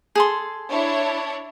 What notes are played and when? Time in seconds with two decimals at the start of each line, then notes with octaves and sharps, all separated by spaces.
0.15 G#4 A4 C6
0.70 D4 E4 C#5